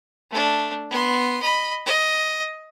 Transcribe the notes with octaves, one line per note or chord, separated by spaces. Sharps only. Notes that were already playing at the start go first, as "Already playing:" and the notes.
A3 D4
B3 C6
D#5 B5
D#5